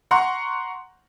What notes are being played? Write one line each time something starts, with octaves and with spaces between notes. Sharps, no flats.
F#5 A#5 C6 C#6